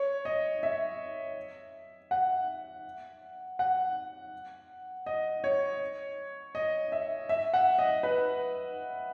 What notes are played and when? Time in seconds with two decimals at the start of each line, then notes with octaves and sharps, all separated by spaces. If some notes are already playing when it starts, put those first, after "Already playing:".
Already playing: C#5
0.25 D#5
0.63 E5
2.11 F#5
3.59 F#5
5.06 D#5
5.44 C#5
6.55 D#5
6.92 E5
7.29 E5
7.54 F#5
7.78 D#5
8.03 B4